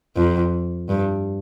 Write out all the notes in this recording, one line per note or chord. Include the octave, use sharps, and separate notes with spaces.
F2
G2